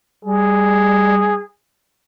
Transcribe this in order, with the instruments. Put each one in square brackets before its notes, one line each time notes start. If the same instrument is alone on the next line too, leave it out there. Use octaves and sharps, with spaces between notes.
[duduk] G3 [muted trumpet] G#4